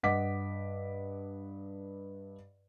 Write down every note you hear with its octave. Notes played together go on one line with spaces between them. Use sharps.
G2 D#5 F#5 D6 B6